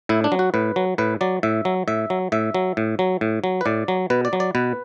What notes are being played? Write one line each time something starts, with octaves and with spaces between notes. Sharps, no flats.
A2 E4
D4
F#3
F#4
A2 B4
F#3
A2 B4
F#3 D5
A2 E5
F#3
A2 E5
F#3
A2 E5
F#3
A2
F#3
A2
F#3
B4
A2 D5
F#3
B2 B4
D5
F#3
D5
B2 B4